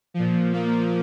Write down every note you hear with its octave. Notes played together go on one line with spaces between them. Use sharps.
A#2 F3
A#3